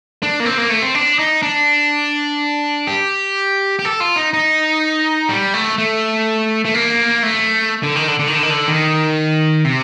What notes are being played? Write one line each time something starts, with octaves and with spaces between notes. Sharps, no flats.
D4
A#3
C4
A#3
A3
C4
D4
D#4
D4
G4
G4
A4
F4
D#4
D#4
G3
A3
A3
A3
A#3
A3
D3
D#3
D3
D3
D#3
D3
D#3
D3
D#3
C3